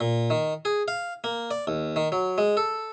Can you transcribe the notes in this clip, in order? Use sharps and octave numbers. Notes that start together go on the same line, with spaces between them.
A#2
D#3
G#4
F5
A#3
D5
D#2
D#3
F#3
G#3
A4